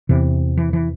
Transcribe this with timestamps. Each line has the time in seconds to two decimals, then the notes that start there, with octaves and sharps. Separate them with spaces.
0.09 E2 C3 E3
0.57 E3
0.73 E3